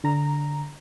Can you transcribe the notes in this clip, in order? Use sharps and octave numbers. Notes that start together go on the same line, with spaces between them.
D3 A#5